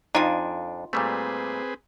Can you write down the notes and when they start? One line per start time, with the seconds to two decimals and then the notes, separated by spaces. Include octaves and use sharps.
0.15 F2 D4 D#4 F4 G#5
0.93 A#2 G3 A3 C4 G#4 B4